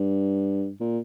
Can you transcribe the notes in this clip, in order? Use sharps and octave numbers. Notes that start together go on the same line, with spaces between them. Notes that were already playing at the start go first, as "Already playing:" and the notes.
Already playing: G2
A#2